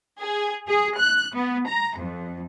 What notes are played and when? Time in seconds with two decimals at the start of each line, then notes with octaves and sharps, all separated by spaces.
0.19 G#4
0.67 G#4
0.97 F#6
1.34 B3
1.65 A#5
1.97 F2